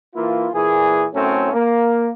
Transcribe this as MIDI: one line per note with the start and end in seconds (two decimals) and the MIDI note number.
0.15 0.48 52
0.15 0.48 58
0.15 0.48 64
0.15 0.48 65
0.54 1.06 46
0.54 1.06 52
0.54 1.06 68
1.13 1.51 42
1.13 1.51 45
1.13 1.51 54
1.13 1.51 57
1.13 1.51 60
1.13 1.51 61
1.53 2.10 58